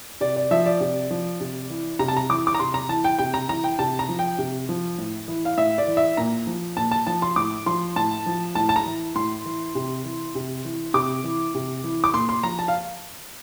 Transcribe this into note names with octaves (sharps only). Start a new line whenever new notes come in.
C3 D5
D5
F3 E5
D5
C3
F3
C3
E3
C3 A#5
A5
A#5
E3 D6
D6
A#5
C3 C6
A#5
E3 A5
G5
C3 G5
A#5
E3 A#5
G5
C3 A5
A#5
F3
G5
C3
F3
A2
E3
F5
A2 E5
D5
E3
E5
A#2 A#5
F3
A#2 A5
A5
F3 A5
C6
A2 D6
F3 C6
A2 A5
F3
A2 A5
A5
A#5
E3
A2 C6
E3
C3
E3
C3
E3
C3 D6
E3
C3
E3
D6
A#2 C6
C6
F3 A#5
A5
F5